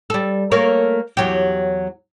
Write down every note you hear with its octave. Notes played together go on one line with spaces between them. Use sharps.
G3 A4
A3 A#3 C#5
E2 F#3 G4